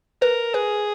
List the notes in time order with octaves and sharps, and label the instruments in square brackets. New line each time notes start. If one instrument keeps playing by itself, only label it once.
[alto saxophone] A#4 [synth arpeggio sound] B4
[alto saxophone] G#4 [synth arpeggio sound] B4